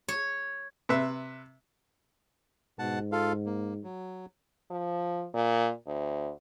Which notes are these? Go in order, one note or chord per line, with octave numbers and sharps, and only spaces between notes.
C#5
C3 B4 E5
G#2 B2 F#5 A5
F4 A4 F5
A#3
F#3
F3
A#2
D2